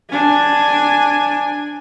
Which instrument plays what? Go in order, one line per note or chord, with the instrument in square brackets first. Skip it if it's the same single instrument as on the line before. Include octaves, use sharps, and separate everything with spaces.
[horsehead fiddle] D4 G#5